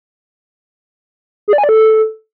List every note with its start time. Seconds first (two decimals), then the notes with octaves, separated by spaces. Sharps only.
1.48 G#4
1.53 D5
1.58 G#5
1.64 D5
1.69 A4